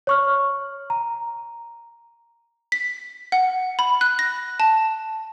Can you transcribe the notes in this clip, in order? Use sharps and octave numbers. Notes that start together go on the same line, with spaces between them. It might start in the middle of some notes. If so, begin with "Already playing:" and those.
C#5 C#6 F6
A#5
B6
F#5
B5
F#6
A#6
A5